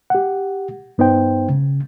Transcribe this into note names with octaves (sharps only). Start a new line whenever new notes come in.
G4 F#5
G2 B3 D#4 C5 G5
C#3